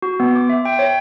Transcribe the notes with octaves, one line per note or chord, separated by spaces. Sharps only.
F#4
B3
D6
E5
G5
C#5